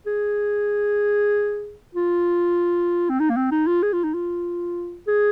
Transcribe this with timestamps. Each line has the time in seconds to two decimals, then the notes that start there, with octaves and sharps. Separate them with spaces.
0.06 G#4
1.95 F4
3.10 C4
3.20 D#4
3.30 A#3
3.36 C4
3.51 D#4
3.67 F4
3.83 G#4
3.93 F4
4.04 D#4
4.14 F4
5.08 G#4